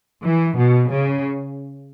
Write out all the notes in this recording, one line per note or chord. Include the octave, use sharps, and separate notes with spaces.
E3
B2
C#3